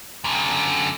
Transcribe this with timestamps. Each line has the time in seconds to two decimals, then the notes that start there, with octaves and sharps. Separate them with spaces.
0.24 F#2 D3